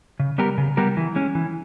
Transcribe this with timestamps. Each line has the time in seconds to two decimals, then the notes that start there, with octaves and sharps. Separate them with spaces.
0.20 C#3
0.38 G3 B3 G4 A#4
0.58 C#3
0.77 G3 B3 G4 A#4
0.97 E3
1.16 G#3 C#4
1.35 E3